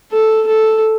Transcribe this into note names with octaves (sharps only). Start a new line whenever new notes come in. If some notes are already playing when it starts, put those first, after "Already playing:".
A4
A4